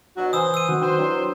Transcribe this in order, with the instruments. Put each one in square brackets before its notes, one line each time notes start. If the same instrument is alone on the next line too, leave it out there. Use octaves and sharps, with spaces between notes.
[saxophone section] B2 F#3 D4 [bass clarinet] F#4
[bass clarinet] E3 [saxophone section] C5 [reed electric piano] G#5 [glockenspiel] D#6 E6
[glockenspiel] E6 D#7
[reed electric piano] D#3 F#3 C4 [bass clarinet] F#4
[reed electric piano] D4 G5 [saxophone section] B4 C5
[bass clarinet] F#3 [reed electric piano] D4 E4 F#4